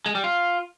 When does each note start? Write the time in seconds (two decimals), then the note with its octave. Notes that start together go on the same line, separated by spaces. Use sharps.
0.06 G#3
0.15 G3
0.24 F4